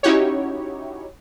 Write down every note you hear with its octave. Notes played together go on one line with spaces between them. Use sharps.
C#4 D#4 E4 F#4 G4 C#5